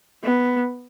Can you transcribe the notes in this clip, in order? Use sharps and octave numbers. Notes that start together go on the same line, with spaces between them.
B3